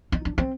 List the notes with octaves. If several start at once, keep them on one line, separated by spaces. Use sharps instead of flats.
D#4
D4
C4